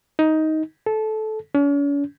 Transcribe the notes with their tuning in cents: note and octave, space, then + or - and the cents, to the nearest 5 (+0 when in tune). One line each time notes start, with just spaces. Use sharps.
D#4 +10
A4 -20
C#4 +45